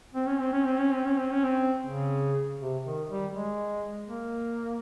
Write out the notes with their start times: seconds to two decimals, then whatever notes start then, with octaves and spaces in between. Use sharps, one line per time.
0.15 C4
0.27 C#4
0.40 C4
0.53 C#4
0.66 C4
0.79 C#4
0.92 C4
1.05 C#4
1.18 C4
1.31 C#4
1.44 C4
1.86 C#3
2.60 C3
2.85 D#3
3.09 G3
3.34 G#3
4.08 A#3